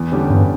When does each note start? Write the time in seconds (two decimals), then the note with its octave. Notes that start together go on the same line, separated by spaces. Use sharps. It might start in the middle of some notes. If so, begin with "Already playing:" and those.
Already playing: E2
0.12 D3 G3 C#4 G4
0.30 E2 G2